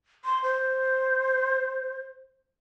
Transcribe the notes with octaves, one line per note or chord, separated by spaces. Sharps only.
C6
C5